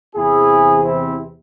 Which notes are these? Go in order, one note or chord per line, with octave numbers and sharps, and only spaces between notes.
E2 C3 E3 E4 G#4
C4 E4